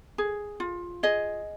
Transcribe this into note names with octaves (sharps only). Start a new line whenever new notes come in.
G#4
F4
G#4 D#5